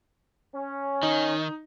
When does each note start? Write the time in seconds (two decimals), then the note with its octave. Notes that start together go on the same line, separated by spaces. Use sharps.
0.55 C#4
1.03 D#3 D#4